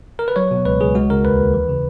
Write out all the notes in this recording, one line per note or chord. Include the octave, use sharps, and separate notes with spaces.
A#4
B4
F#3 C#5
B2
C#2 B4
C#2 G#4
G#3 F#4
C#3 A#4
D#2 B4
D#2
E3
C#3